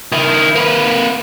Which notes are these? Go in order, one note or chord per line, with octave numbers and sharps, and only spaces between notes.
D#3 E4
A#3 B4